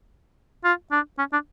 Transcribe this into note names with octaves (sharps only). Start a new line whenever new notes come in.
F4
D4
C#4
D4